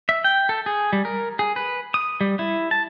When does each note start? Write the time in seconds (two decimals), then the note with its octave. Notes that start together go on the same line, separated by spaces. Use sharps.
0.09 E5
0.24 G5
0.49 A4
0.66 G#4
0.93 G3
1.05 A#4
1.39 G#4
1.56 B4
1.94 D#6
2.21 G3
2.39 E4
2.71 A5